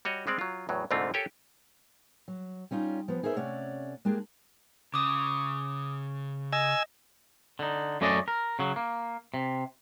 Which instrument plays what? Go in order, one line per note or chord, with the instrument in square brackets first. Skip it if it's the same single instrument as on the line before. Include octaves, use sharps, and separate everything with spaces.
[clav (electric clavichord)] G3 F#4 C#5 D#5
G3 G#3 C4 D5
F#3 F4
E2 A2 F#3
C2 G#2 D3 A3 C4 F4
G4 A4 A#4 C#5 G5 G#5
[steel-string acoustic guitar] F#3
G3 C#4 D#4 F4
F3 B3
D#4 G#4 A#4 C5 C#5 E5
C3 A3 C#4 C#5 D5 F#5
G#3 A#3 D4 G4 G#4
[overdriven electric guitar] C#3 [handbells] D6 D#6
[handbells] D#5 [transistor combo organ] G#5 E6
[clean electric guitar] D3 D#4
F#2 A3 C#4 D5 D#5
A#4
C#3 F#3
A#3
C3